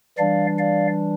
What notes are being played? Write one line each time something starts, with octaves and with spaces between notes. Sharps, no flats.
E3 G3 D4 D5 F5
D5 F5